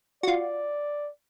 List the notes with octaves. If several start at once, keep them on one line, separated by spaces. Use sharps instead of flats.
F4 F#4 D5